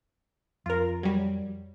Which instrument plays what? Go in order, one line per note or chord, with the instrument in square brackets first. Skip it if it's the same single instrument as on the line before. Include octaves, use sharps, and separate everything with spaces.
[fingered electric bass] F2 [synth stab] F4 A#4
[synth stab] F#3 G3